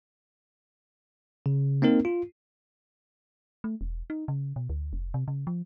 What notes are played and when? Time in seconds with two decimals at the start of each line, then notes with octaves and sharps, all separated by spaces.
1.46 C#3
1.82 A#3 C4 D#4 A#4
2.05 F4
3.64 A3
3.81 E1
4.10 D#4
4.28 C#3
4.56 B2
4.69 D2
4.93 F1
5.14 C3
5.28 C#3
5.47 F3